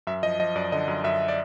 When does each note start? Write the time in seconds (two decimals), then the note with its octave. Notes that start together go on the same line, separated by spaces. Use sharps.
0.07 F#2 E5
0.23 F3 D#5
0.39 F3 D#5
0.56 F#2 D5
0.72 D3 D#5
0.88 F#2
1.04 F#2 E5
1.28 D5